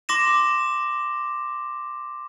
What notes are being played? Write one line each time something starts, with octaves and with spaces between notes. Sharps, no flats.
C6 D6 A#6 E7